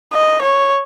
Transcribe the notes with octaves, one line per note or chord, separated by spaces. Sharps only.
D#5
C#5